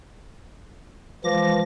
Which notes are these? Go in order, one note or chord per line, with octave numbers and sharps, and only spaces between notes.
E3 F3 G#3 D6 A#6